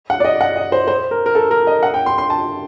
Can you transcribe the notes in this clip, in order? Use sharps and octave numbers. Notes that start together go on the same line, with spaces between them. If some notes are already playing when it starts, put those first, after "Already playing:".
F#5
D5
D#5
F#5
D#5
C5
C5
A#4
A#4
A4
A#4
D#5
F#5
G5
C6
C6
A5